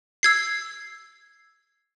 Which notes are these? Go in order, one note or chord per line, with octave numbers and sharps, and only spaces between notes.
E6 G#6 C7